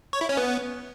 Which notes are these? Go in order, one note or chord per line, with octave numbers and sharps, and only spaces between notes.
C#5
E4
C#4
B3